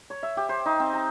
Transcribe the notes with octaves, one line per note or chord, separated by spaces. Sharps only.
C#5
E5
G4
C5
D#4
C4
A#5